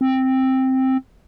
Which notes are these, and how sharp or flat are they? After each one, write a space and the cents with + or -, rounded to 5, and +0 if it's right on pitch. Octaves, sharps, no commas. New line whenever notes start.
C4 +5